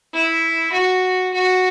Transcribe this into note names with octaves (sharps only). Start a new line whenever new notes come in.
E4
F#4
F#4